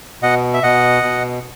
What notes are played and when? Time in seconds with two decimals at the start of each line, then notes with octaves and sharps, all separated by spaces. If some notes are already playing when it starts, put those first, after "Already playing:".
0.22 B2 D#5 F#5
0.54 E5
0.63 B2 D#5 F#5
1.03 B2